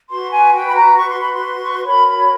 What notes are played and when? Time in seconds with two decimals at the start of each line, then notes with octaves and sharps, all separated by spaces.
0.10 F#4 B4 C6
0.32 G#5
0.55 G5
0.69 B5
0.76 A#5
0.98 C#6
1.10 C6
1.21 B5
1.34 C6
1.62 C#6
1.74 C6
1.86 F#4 A#4 C#5 B5
2.07 B5